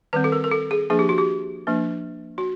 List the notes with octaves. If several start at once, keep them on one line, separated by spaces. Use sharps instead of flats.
D#3 G3 C4 B4
A4
A#4
A#4
A4
G#4
F3 A#3 D4 G#4
G4
F#4
G4
F3 A#3 D4
F#4